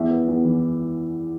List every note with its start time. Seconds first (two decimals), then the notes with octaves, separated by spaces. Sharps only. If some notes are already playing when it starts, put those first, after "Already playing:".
Already playing: E2 E5
0.11 B3
0.28 E2
0.45 E3